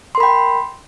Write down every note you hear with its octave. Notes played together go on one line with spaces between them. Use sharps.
A#4 G5 B5 C6